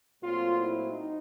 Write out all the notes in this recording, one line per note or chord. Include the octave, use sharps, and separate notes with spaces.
A#2 F#3 A3 C4 F4
E4
D#4